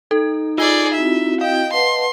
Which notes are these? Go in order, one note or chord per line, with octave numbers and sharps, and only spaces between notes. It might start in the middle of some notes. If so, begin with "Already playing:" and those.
D#4 A4
F4 G#4 D5 G7
C4 E4 F#4 E5
D#5 F5 G5
B4 F#5 A5 C6